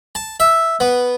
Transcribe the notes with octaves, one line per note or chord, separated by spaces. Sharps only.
A5
E5
B3